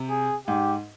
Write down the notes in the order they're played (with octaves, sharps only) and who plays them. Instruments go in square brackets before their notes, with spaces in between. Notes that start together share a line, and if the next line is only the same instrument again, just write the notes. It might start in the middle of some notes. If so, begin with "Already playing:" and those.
Already playing: [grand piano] C3
[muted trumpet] G#4
[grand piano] G#2 [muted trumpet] G4